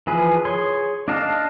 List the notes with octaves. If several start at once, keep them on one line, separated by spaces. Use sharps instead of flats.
E3 F3 G#4 B4
G#4 C#5 C6
D4 D5 D#5 F5 A5